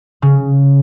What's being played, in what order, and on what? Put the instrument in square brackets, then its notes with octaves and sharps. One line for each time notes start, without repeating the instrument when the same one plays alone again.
[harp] C#3